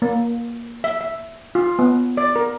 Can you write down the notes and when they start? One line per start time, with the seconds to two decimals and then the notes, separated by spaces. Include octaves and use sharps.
0.02 A#3
0.84 E5
1.01 E5
1.55 F4
1.79 B3
2.17 D5
2.36 A#4